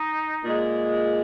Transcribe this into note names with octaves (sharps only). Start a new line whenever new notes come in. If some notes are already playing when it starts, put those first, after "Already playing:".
Already playing: D#4
A#2 G#3